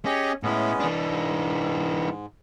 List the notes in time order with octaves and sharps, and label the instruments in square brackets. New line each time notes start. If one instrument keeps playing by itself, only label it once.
[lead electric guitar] C#4 [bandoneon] G4 G#4 D#5
[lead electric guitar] A2 E4 [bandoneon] G#3 B3 C#4
[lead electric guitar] E3 D4
[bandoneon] G#2